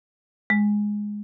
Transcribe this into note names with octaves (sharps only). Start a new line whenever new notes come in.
G#3